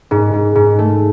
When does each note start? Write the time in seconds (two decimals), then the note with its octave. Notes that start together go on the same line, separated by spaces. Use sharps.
0.11 G#2
0.33 G#2
0.55 G#2
0.79 A3